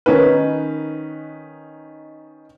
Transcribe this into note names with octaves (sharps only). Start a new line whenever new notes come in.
D#3 C#4 D#4 B4